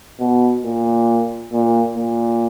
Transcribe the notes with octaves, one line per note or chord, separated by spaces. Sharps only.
B2
A#2
A#2
A#2